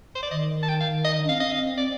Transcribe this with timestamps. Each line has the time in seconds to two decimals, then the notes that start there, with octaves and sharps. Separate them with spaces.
0.15 C5
0.23 D5
0.31 D#3 D#5
0.63 A5
0.69 G5
0.81 F5
1.05 D#5
1.25 D4
1.29 C4 F5
1.40 D#5
1.52 F5
1.78 D5